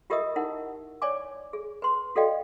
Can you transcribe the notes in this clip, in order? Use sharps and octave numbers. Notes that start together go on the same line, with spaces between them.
F4 G4 A#4 D#5 E5 D#6
D#4 E4 A#4 F#5
C#5 D5 G#5 D6
G#4
B4 C6
F#4 A4 D5 D#5 F5 G5